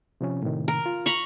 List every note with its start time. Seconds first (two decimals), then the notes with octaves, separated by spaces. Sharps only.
0.21 C3 F3 C#4
0.42 A2 C3 D#3
0.68 A#4
0.86 F4
1.06 A#5 B5 C#6